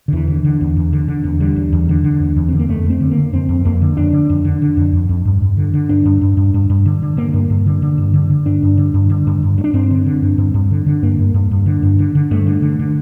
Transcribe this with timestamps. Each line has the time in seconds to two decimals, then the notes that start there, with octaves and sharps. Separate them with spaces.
0.08 D3
0.13 E2 E3
0.28 D3
0.45 D3
0.61 E2
0.77 E2
0.93 D3
1.08 D3
1.24 E2
1.40 D3 G3
1.56 E2
1.73 E2
1.89 D3
2.04 D3
2.20 E2
2.36 E2
2.49 D3 C4
2.59 A#3
2.69 F2 A3
2.84 F2
2.90 C4
3.00 D3
3.11 A#3
3.17 D3
3.33 F2 C4
3.49 F2
3.65 F2 A#3
3.82 D3
3.97 F2 D4
4.13 D3
4.30 F2
4.45 D3
4.62 D3
4.77 F2
4.93 F2
5.09 F2
5.25 G2
5.42 G2
5.57 D3
5.74 D3
5.89 G2 D4
6.06 G2
6.21 G2
6.37 G2
6.54 G2
6.70 G2
6.86 D3
7.02 D3
7.17 D3 A#3
7.34 G2
7.50 G2
7.66 D3
7.82 D3
7.98 G2
8.14 D3
8.30 D3
8.46 G2 D4
8.63 G2
8.77 D3
8.94 G2
9.10 D3
9.27 G2
9.43 G2
9.58 G2
9.64 D4
9.74 G2 C4
9.91 D3
10.06 D3
10.22 G2
10.38 G2
10.54 G2
10.71 D3
10.86 D3
11.03 G2 A#3
11.19 G2
11.34 G2
11.51 G2
11.66 D3
11.83 G2
11.99 D3
12.15 D3
12.31 G2 A3
12.47 D3
12.62 D3
12.79 D3